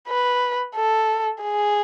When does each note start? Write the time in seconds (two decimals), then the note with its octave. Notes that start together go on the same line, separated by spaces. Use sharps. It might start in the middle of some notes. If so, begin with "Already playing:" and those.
0.08 B4
0.76 A4
1.43 G#4